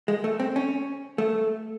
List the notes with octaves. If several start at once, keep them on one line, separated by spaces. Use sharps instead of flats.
G#3
A3
C4
C#4
A3